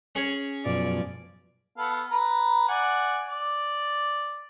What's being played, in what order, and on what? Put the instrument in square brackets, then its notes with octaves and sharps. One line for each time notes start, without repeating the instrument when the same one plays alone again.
[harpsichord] C#4 G#4 C#5
[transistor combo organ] F#2 B2 F3 [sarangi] D5
[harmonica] B3 A4 F5
B4 A#5
D5 F#5 G#5
D5